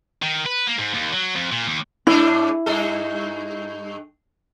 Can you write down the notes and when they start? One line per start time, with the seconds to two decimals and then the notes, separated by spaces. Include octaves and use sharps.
0.22 D#3
0.46 B4
0.67 A#3
0.79 G#2
0.95 D#2
1.14 F#3
1.36 F2
1.52 A#2
1.67 D#2
2.07 G#2 A3 D4 E4
2.66 G2 D#4 A4